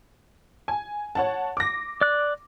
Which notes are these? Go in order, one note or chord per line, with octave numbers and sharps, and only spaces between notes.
G#5
C#5 F#5 A5
D6 A#6
D5 F#6